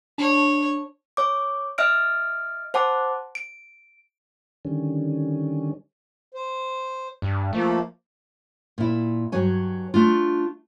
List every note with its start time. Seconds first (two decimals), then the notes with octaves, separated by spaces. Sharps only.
0.18 D4 C#5
1.17 C#5 D6
1.78 D#5 E5 F6 D7
2.74 C5 F#5 A5 D6
3.35 D7
4.65 D3 D#3 G3 C#4
6.34 C5
7.22 G2
7.53 F3 A3 A#3
8.78 A#2 E4
9.32 G2 F#3 C#5 G#5
9.94 A3 D4 F4